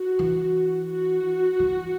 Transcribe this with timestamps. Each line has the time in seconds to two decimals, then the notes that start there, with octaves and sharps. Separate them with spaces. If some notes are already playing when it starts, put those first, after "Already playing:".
Already playing: F#4
0.19 E3
0.89 F#4
1.60 E3